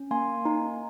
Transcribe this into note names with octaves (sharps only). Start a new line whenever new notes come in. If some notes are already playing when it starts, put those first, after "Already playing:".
Already playing: C#4
A#3 G#5 C6
D#4